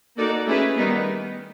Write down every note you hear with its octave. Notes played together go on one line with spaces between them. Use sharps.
A#3 D#4 F#4 A4 D5
A3 C#4 E4 G#4 B4
D#3 G3 B3 D#4